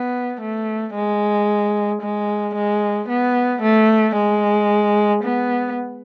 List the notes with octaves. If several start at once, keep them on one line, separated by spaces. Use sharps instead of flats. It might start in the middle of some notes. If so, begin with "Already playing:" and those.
Already playing: B3
A3
G#3
G#3
G#3
B3
A3
G#3
B3